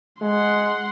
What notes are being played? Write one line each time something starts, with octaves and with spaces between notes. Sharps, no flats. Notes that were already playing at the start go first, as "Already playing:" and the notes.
G#3 F#5 C6